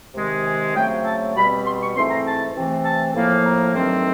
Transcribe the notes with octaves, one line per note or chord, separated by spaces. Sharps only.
C3 D#3 G#3
G#5
C#3 F#3 A3 C4 G5
A5
B2 G3 C4 B5
C6
C#6
G#2 E3 A3 C4 C6
A#5
A5
C3 E3 A3 C4
A5
A2 F3 A#3
A#5
G2 D#3 F#3 A3 C4